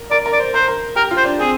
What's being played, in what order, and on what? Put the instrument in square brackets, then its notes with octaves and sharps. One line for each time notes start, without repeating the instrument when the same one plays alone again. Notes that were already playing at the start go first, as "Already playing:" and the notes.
Already playing: [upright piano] A#4
[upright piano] A#4 [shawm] D5
[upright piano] A#4
[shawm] D5
[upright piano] C5
[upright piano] A#4 [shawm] C5
[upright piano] A#4
[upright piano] G4 [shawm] A#4
[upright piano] F4
[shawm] C5
[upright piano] D4
[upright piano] C4 [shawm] G#4